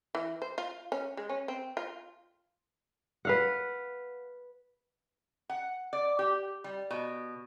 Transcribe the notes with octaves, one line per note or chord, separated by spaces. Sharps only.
E3
C5
F4
C#4
G#3
C#4
C4
F4
B4 F5 F#5
F#5
D5
G4
G3
B2